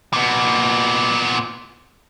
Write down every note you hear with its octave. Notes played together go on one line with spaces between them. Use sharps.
A#2 B3